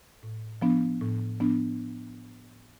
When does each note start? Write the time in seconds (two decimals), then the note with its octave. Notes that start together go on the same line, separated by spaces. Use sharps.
0.23 A2
0.62 F3 B3 D4
1.01 A2
1.40 F3 B3 D4